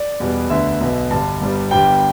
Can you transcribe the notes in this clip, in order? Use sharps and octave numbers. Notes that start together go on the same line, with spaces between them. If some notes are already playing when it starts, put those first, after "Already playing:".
Already playing: D5
E2 B2 G3 B3
D2 D3 B3 E5
B1 B2 B3
G1 G2 D3 A5
G1 G2 G3 B3
G1 G2 G3 B3 G5